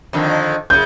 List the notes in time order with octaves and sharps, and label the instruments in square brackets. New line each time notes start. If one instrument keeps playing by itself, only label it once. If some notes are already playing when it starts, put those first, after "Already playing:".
[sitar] F2 D3 D#3
[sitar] F#2 C#3 [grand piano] G6